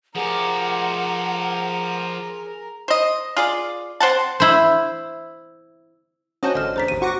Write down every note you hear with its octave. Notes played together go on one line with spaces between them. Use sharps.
F3 G4 G#4 A#4 F#5
C5 D#5
F4 G#4 D5
C4 C5 F#5 A5
E4 C5
C#4 F#4 C5 D#5 A5 G6
A1 D3 D#5 F6 E7
E2 D4 C5 A#5 B6
A1 D#2 D#7
F#4 C#6 D6 A#6